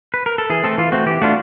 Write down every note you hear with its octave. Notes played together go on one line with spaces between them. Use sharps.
B4
A#4
A4
E3 G#4
A3 C4 A4
E3 F4
A3 C4 F#4
E3 G4
A3 D4 F4 F#4